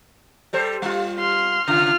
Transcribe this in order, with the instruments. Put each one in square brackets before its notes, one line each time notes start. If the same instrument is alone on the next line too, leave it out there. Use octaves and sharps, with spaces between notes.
[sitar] G3 A4 C5
G3 F4
[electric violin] C6 F6
[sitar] C#3 [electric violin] F4 F6